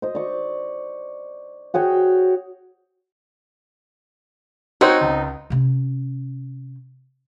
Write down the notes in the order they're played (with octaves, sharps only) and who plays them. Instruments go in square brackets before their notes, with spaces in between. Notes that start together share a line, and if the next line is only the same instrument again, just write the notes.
[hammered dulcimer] C5 D#5
D5 C#6
F#4 G#4 C#5 G5
[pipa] C4 D#4 [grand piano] F#4 C5 C#5
[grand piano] C#2
[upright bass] C3 C#4